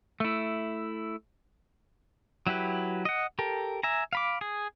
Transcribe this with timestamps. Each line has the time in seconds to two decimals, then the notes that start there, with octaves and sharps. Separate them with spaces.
0.20 A3 E4
2.47 F#3 E4 G4 B4
3.05 D#5 F#5
3.39 G4 A4 A#4
3.83 E5 G#5 A#5
4.13 F5 B5 D6
4.41 G#4